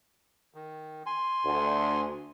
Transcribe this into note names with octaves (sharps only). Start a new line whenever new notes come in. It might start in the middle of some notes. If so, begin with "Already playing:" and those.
D#3
G#5 C6
D2